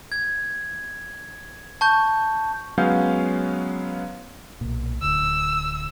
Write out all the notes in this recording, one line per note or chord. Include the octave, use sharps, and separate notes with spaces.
G#6
A5 C#6 G6
F#3 G#3 B3 C#4 F5 G6
B1 A#2
D1 D2 E6